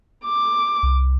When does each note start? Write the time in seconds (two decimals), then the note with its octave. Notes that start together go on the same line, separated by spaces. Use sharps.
0.25 D6
0.83 C2